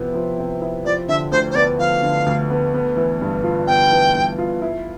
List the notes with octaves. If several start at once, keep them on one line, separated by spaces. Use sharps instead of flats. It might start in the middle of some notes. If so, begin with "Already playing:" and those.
Already playing: C3 F3 B3 E4
F3
C3
E4
F3 D5
D3 E5
D2 C5
C5
B3 D5
F3 F5
D3
D2
B3
B3
E3
G2
F4
B3 G5
E3
G2
F4
E4